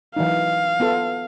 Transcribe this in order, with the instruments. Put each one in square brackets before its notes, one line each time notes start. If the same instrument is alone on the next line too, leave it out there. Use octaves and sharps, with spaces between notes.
[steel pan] E3 F#3 D#4 [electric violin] F5
[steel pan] B3 F4 A4